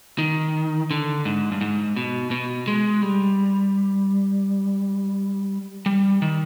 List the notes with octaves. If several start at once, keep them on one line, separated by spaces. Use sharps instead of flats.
D#3
D3
G#2
G2
G#2
B2
B2
G#3
G3
G3
D#3